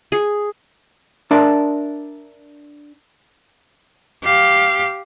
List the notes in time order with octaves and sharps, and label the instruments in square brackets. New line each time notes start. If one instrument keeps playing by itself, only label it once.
[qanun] G#4
[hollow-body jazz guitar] D4 A#4 E5 A5
[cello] G4 F5